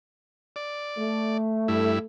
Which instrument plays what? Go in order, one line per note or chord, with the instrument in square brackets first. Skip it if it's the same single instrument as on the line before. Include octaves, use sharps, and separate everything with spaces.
[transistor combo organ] D5
[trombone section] A3
[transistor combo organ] G2 E4